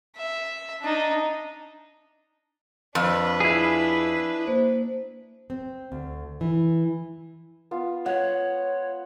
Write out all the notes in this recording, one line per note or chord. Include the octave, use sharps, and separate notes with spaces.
E5
D4 D#4
F2 D4 B4
E4 G#4
A#3 C5
C4
D2
E3
B3 F4
C#5 F#5